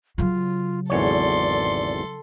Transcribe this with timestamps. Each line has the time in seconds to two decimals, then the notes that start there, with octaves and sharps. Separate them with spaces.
0.18 C#3 F#3 F4
0.90 G#1 E2 A4 C#5 D5 C6